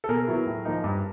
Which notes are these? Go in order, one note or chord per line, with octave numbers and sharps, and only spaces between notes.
A4
B2 G#4 A#4
F#3 B3 E4
A2
F3 A#3 D#4
G2